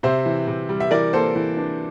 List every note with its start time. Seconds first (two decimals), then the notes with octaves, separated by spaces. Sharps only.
0.03 C3 C5 E5
0.26 E3
0.47 C3
0.69 G3
0.80 E5
0.91 E3 A#4 D5
1.13 A#3 A4 C5
1.36 E3
1.57 D4